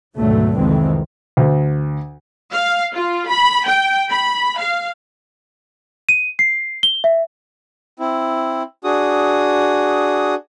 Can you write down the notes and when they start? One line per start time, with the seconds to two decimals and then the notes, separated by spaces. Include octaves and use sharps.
0.18 G#1 D2 G#2 B2 F#3 A3
0.56 C2 F2 D#3 E3 G#3 C4
1.37 D2
2.54 F5
2.94 F4
3.28 B5
3.66 G5
4.10 B5
4.59 F5
6.09 D#7
6.39 C7
6.83 G7
7.04 E5
7.99 C4 E4
8.84 D4 F#4 G#4 D#6